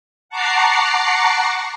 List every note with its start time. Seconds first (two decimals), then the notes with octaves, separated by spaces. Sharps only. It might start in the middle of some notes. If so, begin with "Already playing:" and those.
0.29 F#5 A5 A#5 C#6 D6 C7